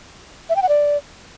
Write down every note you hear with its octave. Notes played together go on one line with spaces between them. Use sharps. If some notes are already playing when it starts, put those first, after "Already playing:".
E5
G5
F#5
D5